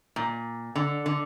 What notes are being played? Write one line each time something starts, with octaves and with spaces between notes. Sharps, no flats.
A#2
D3
D3